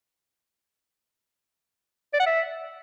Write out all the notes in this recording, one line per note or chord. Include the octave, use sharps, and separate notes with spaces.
D5
F#5
E5